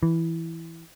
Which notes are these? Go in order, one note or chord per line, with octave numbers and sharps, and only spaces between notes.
E3